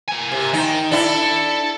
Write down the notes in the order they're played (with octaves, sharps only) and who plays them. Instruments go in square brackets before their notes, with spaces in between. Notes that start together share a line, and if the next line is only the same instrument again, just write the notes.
[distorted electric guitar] A#3 G#5
[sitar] C3
[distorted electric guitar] D#3 [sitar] D#4
[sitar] D4 E4 [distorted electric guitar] A4